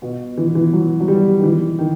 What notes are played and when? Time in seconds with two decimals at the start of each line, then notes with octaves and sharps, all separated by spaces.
0.02 B2
0.37 E3
0.55 E3
0.73 F#3
1.00 F#3
1.08 G3
1.38 D#3
1.44 E3
1.79 D#3